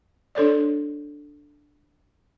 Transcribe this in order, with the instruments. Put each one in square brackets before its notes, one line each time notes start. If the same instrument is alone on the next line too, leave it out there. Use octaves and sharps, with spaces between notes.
[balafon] D4 A4 C#5 D5